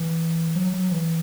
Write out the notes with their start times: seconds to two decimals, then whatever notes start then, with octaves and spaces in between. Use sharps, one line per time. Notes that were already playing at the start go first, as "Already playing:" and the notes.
Already playing: E3
0.55 F#3
0.73 F#3
0.91 E3